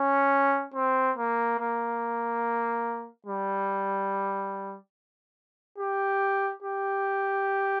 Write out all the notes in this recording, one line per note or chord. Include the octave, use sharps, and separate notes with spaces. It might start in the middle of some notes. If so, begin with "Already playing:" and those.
Already playing: C#4
C4
A#3
A#3
G3
G4
G4